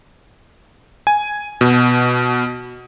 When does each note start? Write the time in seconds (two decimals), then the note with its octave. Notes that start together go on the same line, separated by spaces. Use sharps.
1.07 G#5
1.61 B2